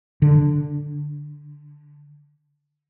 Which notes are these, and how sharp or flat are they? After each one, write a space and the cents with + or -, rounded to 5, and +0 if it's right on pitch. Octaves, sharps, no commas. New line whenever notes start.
D3 +0